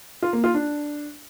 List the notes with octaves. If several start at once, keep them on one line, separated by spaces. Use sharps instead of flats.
F4
A#3
F4
D4